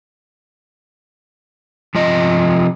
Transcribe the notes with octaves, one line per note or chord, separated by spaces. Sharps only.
C3 F3 F4 D#5